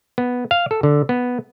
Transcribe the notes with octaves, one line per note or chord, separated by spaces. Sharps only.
B3
F5
A4
D3
B3